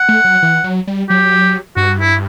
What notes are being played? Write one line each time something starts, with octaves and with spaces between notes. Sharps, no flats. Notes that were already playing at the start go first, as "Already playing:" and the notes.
Already playing: F#5
A3
F#3
E3
F#3
G3
F#3 G4
G2 F#4
E4